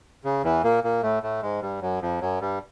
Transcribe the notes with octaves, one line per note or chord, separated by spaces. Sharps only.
C#3
E2 E3
A#2 A#3
A#2 A#3
A2 A3
A2 A3
G#2 G#3
G2 G3
F#2 F#3
F2 F3
F#2 F#3
G2 G3